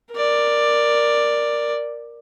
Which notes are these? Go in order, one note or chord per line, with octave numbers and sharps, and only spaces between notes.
A#4 D5